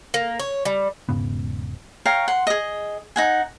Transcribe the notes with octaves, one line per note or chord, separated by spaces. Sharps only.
A#3
C#5
G3
E1 G#2 C#3 B3
C#5 F5 G5 A#5
F#5 C6
G#4 D#5
D#4 F#5 G#5